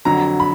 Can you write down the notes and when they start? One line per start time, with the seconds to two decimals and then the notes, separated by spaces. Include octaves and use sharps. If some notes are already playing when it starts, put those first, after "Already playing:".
0.05 F2 D3 F#3 A#5
0.40 B5